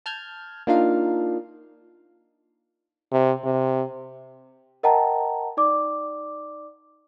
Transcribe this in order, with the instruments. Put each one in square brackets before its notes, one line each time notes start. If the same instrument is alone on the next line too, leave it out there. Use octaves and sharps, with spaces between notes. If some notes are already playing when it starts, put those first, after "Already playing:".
[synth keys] A5 F6 G6 G#6
A#3 D4 D#4 F4 F5
[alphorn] C3
C3
[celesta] A#4 D#5 F#5 G5 A5 A#5
D#4 D5 D6